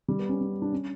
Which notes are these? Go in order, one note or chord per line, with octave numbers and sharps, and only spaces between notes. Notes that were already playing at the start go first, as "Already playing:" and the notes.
G3
B3
C#4
C#4
D4
C#4